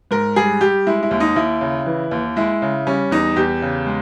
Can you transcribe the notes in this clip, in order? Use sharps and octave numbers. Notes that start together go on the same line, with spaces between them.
G#2 A#4
G3 G#4
G3 G4
G#3 E4
E4
D#2
D#4
D#2 E4
C#3
E3
D#2
G#3 E4
C#3
G3 C#4
E2 D#4
E2 G4
C#3
G#3